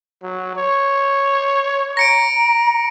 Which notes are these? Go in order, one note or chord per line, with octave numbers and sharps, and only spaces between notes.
F#3
C#5
A#5 A#6 C#7 D7